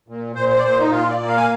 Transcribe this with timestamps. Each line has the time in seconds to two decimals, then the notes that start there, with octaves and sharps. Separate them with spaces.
0.08 A#2
0.35 A#2 C5
0.49 C5
0.58 D5
0.63 A#2 C5
0.80 D#4
0.90 A#2 F4
1.09 D5
1.18 A#3
1.28 F5
1.37 G#5